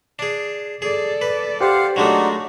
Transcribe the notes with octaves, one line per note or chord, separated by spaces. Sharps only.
D4 G#4
G#4 A4 D5
B4
G4 C5 F5 F#5
F#3 G#3 A3 D4 D#4 F#4